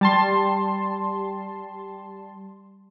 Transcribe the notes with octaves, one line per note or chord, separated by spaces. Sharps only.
G3 A5 C6